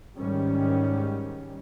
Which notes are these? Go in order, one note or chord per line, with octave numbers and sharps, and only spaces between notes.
G#2 D#3 G3 C#4